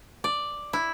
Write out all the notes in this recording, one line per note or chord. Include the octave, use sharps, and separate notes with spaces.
D5
E4